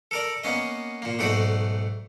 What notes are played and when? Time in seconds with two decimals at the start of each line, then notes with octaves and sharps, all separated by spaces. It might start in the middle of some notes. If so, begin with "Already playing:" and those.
0.11 A4 A#4 D5
0.44 A#3 B3 C#4 D#5
1.02 A#2 A#3
1.19 B1 G#2 A3 F#4 D5 D#6